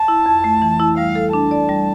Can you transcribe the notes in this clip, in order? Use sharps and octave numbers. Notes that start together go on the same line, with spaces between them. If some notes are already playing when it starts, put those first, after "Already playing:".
Already playing: A5
E4
F2
A3
E3
E4
G3 F5
A4
D4 A5
D5
G3